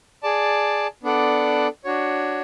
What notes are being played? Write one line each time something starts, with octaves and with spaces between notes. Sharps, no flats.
G#4 D5 A5
B3 D4 A4 D5 F#5
D4 F#4 C#5